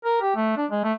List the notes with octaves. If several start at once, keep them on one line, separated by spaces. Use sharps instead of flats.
A#4
G4
A3
D4
G#3
A3